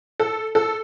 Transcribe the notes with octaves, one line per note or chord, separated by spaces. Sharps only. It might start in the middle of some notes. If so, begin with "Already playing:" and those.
A4
A4